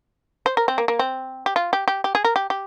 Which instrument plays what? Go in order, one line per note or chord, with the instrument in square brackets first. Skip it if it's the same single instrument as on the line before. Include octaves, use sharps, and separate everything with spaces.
[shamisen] C5
A#4
C4
A#3
A#3
C4
G4
F4
G4
G4
G4
G#4
A#4
G4
G4